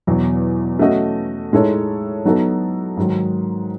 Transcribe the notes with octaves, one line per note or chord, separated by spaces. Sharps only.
E2 B2 F#3
A3 C#4 F#4 A4 D#5
A2 G#3 D#4 A4 C#5
F#3 B3 D#4 F#4 A4
G#2 D#3 F#3